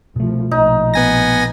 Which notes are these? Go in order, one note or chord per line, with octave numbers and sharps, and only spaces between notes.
C2 B2 F3 A3
A#1 D#4
B3 G#5 A#6